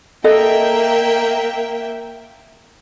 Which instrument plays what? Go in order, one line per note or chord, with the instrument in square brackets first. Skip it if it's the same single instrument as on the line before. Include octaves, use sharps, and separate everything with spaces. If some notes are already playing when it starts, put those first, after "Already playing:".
[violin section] A#3 E5 G5 [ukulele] A4 D#5